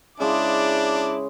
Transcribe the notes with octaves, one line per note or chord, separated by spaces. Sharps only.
C#3 G#3 D4 E4 D6